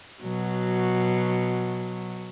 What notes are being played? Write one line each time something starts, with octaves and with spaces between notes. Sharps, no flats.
B2 F#3